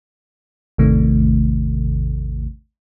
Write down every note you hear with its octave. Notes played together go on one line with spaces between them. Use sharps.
A1 E2 C3 D#3 A3